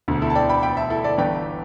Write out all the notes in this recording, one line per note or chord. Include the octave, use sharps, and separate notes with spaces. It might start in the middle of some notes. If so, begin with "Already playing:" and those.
E1 D2 D3
E4 A4
A5
D5 G5
G5 B5
G5 B5
E5 A5
E4 A4
A4 D5
G1 G2 E3 D5 G5